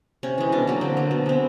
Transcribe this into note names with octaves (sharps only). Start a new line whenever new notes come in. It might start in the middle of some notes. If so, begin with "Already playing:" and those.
C3 C#4
E3 G#3
B2 D4
F#3 A#3
D3 C4
F#3 A#3
B2
G#3 B3 C4